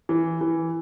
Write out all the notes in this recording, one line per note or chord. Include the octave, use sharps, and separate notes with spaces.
E3
E3